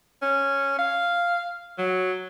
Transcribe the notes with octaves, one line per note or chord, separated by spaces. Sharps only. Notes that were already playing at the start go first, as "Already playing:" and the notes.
C#4
F5
F#3